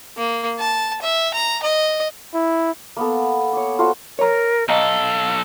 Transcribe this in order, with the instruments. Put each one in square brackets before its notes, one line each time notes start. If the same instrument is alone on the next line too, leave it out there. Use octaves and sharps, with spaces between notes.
[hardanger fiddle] A#3
A5
E5
A#5
D#5
[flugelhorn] E4
[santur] A#3 B3 A4
C#5 D6
F4 F#4 A4 C5
[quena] A#4 [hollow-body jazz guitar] C#5 A#5
[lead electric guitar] B1 A4 [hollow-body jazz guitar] D#5 G#5 A#5 [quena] F5